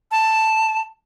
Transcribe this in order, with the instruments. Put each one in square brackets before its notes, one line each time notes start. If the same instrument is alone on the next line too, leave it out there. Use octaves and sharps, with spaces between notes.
[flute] A5